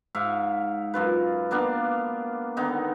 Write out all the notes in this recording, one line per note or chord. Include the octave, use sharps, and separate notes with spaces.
G#2 E5 F5
F#2 F4 B4
A#3 B3 D4 F5
D3 D#3 B3 D#4